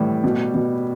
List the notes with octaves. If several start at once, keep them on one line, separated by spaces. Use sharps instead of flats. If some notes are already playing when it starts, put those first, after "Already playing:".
Already playing: A2 E3 G3
B2
B2